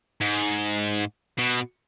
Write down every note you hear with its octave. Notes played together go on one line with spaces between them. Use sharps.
G#2
B2